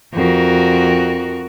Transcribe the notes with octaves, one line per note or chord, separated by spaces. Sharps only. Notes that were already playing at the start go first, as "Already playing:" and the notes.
F2 F#4 A#4